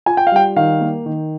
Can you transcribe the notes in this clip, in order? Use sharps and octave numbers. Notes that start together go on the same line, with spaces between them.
F4 G#5
G5
F5
G3 G5
D#3 F5
A#3
D#3